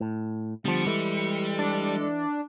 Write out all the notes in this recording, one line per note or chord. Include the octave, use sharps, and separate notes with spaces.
A2
D3 F3 G3 B3 C#7
E3 G#3 A4
D4